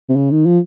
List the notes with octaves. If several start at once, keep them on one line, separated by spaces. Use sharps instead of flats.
C3
C#3
D#3
F3